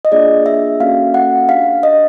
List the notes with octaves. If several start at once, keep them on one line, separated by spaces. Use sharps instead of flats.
D#5
A#3 D4 F4 G#4 D5
E5
A#3 C#4 F#4 A4 F5
F#5
D4 G4 F5
D#5